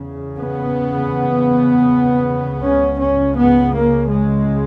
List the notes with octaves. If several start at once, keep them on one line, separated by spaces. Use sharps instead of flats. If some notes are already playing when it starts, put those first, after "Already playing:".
Already playing: E2 C#3
B3
C#2 C#3 C#4
C#4
B3
A#3
G#3